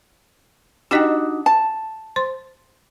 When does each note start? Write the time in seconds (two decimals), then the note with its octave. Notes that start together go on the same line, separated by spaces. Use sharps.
0.91 D4 D#4 F#4 G4 D#5 G5
1.46 A5
2.16 C5 C6